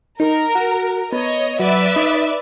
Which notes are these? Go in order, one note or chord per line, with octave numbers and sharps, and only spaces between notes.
D#4 A#4
F#4
B3 C#5 D#5
F#3 B4 D5 E5
D#4